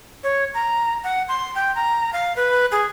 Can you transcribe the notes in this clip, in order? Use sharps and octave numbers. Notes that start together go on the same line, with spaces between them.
C#5
A#5
F#5
C6
G5
A#5
F5
B4
G#4